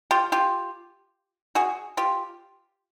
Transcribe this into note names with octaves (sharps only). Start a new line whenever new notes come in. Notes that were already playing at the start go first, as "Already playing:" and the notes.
F4 G4
F4 G4
F#4 G#4
F4 G4